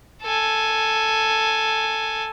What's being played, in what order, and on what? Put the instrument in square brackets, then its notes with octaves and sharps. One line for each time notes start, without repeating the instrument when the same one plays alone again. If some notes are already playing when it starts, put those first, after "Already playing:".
[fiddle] A4 G#5